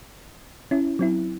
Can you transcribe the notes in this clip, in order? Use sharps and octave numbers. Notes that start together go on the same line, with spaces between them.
C#4 E4
F#3 C4 E4